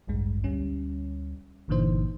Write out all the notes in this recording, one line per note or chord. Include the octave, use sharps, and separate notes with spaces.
A1 D2 G2 G#3
D2 G3 C#4
G1 A#2 D3 E3 D#4 C5